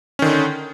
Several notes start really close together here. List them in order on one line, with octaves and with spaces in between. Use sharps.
C#4 D#3 D3